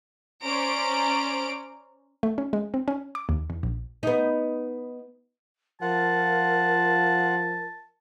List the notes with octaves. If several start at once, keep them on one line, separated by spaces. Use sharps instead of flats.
C#4 C5 D5 A#5 D7
A3
C#4
G#3
C4
C#4
D6
D#2
E2
A#1
B3 D#4
F3 F4 A#4 F#5 A5